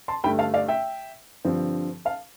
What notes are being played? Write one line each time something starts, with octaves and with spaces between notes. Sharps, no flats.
A5 C6
G2 D3 A3 G5 B5
F5 A5
D5 F5
E5 G5
G2 D3 F3 C4
F5 A5